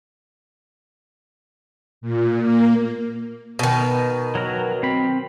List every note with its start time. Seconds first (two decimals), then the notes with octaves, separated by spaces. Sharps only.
2.01 A#2
2.40 A#3
3.59 B2 D#3
4.35 F#3 A#4
4.83 C4 B5